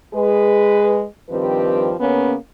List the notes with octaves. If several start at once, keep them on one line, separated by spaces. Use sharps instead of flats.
G#3 G#4 B4
G2 D#3 F3 C4 G4 B4
C#3 A#3 B3 C#4